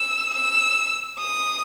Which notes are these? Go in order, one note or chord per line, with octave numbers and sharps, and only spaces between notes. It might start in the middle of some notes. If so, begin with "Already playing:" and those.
Already playing: E6
E6
D#6